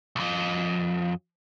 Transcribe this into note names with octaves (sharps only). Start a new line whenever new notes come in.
B1 F2